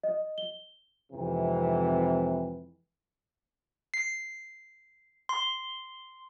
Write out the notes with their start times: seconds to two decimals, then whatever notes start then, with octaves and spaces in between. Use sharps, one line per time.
0.04 D#5
0.38 G7
1.13 F2 G#2 C3 E3
3.94 C7
5.29 C6